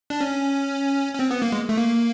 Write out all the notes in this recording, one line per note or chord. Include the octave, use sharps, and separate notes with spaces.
D4
C#4
C#4
C4
B3
A#3
G#3
A3
A#3